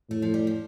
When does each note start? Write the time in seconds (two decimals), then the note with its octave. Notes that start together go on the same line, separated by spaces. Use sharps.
0.10 A2 A3
0.22 F3
0.34 G3
0.47 F3